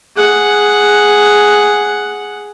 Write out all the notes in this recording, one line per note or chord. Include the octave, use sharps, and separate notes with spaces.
G#4 F#5